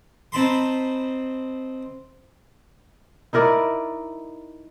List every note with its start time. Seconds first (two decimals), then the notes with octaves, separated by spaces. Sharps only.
0.32 C4 D#4 A5 B5 C6
3.33 D#4 E4 A#4 D5